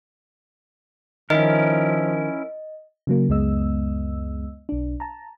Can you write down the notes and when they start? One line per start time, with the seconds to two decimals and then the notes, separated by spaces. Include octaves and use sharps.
1.30 D#3 F3 C#4 E4 A#4 D#5
3.07 C#3 F#3 A#3
3.29 C#2 F#2 G#3 B3 D#5 E6
4.69 B1 D4
5.00 A5 A#5